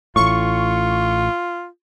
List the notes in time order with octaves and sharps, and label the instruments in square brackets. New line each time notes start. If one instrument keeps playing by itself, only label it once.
[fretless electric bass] A1 A2 [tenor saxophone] F4 [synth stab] C#6